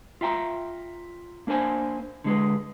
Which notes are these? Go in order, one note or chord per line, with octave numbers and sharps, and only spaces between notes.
F4 E5 G5 A#5
A#3 D4 A#4 C5 G#5
D3 G#3 G#4 B4